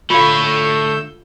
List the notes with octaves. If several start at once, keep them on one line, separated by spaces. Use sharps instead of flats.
D3 A3 F4 A4 C#5 F5 E6 G6